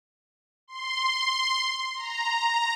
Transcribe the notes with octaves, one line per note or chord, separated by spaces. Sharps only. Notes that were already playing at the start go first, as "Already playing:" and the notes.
C6
A#5